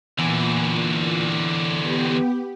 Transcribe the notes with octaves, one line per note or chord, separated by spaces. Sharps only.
E2 A#2 D3 E3
B3 G4